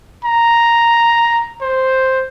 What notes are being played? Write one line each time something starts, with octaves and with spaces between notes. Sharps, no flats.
A#5
C5